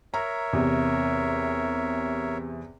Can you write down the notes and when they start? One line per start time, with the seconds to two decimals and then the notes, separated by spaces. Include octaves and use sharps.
0.14 A#4 C#5 E5 A#5
0.53 E2 C3